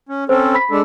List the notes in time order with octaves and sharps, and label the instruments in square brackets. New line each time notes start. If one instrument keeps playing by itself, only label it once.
[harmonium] C#4
[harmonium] C4 C#4 A4 [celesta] C5
[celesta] B5 B6
[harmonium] G#3 D4 A4